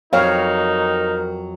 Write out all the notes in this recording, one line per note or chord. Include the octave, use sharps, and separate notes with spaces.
F2 F#3 D#4 A#4 C#5 F5 G5